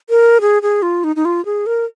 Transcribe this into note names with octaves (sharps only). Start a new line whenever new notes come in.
A#4
G#4
G#4
F4
D#4
D#4
F4
G#4
A#4